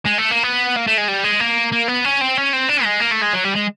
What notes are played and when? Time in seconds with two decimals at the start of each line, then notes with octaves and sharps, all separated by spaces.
0.06 G#3
0.18 A3
0.31 A#3
0.44 B3
0.76 A#3
0.87 A3
0.98 G#3
1.08 G3
1.24 G#3
1.40 A#3
1.72 A#3
1.88 B3
2.05 C#4
2.21 C4
2.37 C#4
2.53 C4
2.69 D4
2.85 G#3
3.02 A#3
3.13 A3
3.23 G#3
3.33 F#3
3.45 G3
3.55 G#3